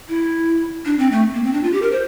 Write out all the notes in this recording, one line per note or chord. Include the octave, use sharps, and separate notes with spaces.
E4
D4
C4
A3
A#3
C4
D4
F4
G4
A#4
C5